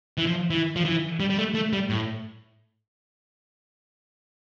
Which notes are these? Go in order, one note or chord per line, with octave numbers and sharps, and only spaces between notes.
E3
F3
E3
F3
E3
G3
G3
A3
A3
G3
A2